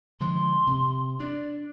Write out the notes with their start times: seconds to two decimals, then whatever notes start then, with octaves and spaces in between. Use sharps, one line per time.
0.20 D3 F3 G#3 C6
0.67 C3
1.20 D4 D5